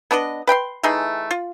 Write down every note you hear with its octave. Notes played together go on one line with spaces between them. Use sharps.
B3 D4 B4 D#5
B4 G5 B5 C6
E3 A3 D#4 G#4
F4